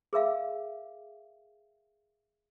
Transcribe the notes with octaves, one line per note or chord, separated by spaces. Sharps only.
G#4 A#4 E5 F5